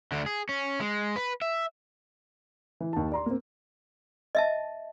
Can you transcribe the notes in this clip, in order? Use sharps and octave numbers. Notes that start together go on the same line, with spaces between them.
D2 D3
G#4
C#4
G#3
B4
E5
E3
D#2 A5
D5 A#5 C6
A#3 C4
D#5 E5 A5